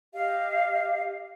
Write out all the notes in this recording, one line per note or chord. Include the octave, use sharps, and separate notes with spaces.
G4 D#5 F5